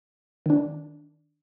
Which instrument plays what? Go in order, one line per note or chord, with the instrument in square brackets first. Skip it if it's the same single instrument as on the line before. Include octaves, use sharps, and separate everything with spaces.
[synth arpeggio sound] D#3 D4